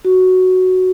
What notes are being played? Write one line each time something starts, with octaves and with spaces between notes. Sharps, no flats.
F#4